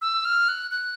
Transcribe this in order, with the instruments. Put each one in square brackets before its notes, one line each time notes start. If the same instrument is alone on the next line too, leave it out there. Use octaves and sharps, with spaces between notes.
[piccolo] E6
F6
F#6
F#6